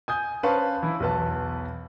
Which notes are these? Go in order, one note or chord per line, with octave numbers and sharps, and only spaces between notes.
G#5 D#6 G6
C#4 B4 C5 F5 A5 C#6
E3 E4
B1 E2 B4 A5